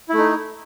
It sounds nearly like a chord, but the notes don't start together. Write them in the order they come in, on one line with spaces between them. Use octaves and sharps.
E4 A3 D#4